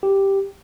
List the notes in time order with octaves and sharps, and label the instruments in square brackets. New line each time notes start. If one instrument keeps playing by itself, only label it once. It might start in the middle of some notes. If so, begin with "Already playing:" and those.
[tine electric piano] G4